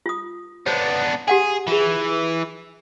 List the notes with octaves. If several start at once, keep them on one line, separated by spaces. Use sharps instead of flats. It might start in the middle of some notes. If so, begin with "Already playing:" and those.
F4 D#6
B3 D4 C5 C#5
G4 G#4 F#5 G#5
E3 F4 G#4